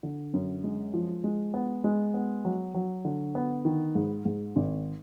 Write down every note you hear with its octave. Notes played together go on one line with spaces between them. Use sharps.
D3
F#2
G#3
F3
G#3
B3
G#3
B3
F#3
F#3
D3
B3
D#3
G#2
G#2
G#1